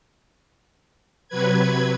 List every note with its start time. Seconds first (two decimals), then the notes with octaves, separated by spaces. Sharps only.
1.28 C3 F#3 B4 G#6